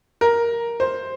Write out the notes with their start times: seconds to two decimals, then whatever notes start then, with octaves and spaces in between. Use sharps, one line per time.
0.21 A#4
0.80 C5